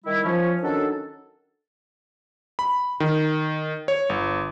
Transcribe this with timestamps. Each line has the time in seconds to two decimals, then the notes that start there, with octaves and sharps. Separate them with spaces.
0.05 D#3 G3 E4
0.24 F3 C#4
0.63 D#3 F#3 C#4 D4 A4
2.59 B5
3.00 D#3
3.88 C#5
4.09 G1